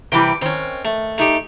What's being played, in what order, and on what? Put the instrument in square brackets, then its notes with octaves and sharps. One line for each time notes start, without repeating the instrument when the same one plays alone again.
[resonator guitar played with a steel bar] C3 E3 G3 [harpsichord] G5 D6
[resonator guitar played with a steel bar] D#3 [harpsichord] C4 C#4
[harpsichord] A3
A3 D#4 G4